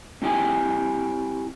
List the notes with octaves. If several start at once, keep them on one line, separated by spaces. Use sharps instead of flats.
C4 E4 G4 G5 G#5